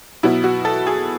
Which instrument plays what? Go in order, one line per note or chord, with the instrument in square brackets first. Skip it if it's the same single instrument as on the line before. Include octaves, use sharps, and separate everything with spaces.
[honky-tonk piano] B2 F#3 B3 E4
F#4
A4
G#4